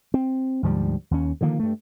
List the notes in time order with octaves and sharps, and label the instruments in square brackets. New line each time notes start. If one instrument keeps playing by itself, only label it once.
[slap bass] C4
D2 G#2 F3 G3
D#2 C#4
D3 D#3 F3 A#3
G2 A3